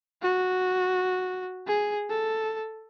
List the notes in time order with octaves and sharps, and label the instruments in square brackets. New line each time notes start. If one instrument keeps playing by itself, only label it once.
[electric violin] F#4
G#4
A4